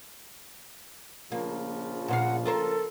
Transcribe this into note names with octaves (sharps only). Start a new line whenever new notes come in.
A#1 C#3 F3 A#3
A#2 C5 F5 F#5
F4 A4 A#4 C5